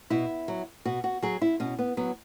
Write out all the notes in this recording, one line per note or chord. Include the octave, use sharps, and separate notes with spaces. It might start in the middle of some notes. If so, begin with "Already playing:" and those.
B2 E4
F#3
B2 F#4
F#4
F#3 G#4
E4
B2 C#4
B3
F#3 B3